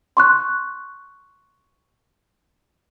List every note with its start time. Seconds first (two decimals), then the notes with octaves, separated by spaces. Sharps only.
0.17 C6 C#6 F#6